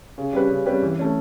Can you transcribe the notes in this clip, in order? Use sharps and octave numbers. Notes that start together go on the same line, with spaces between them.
C#3
G3 C#4 G4 B4
C#3
G3 C#4 G4 B4
E3
A3 C#4